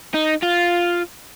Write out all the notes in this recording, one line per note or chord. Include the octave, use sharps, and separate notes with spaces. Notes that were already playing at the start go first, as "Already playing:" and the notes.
D#4
F4